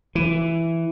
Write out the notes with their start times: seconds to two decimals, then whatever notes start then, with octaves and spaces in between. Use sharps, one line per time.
0.15 E3